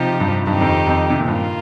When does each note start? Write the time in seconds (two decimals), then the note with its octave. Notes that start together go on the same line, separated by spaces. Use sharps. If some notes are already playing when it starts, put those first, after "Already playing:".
Already playing: C3 F3 D#4 G4
0.20 G2
0.47 G2 D#3 C4 D#4 G4
0.61 F2
0.87 F2
1.10 C3
1.19 A#2
1.28 G2 A#3 F4